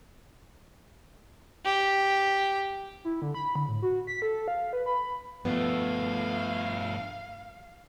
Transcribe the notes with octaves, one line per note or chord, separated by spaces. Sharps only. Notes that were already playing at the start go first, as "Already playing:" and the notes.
G4
E4
D3
B5
D3
A2
F#4
B6
A4
F5
B4
B5
G2 F3 A3 B3 F5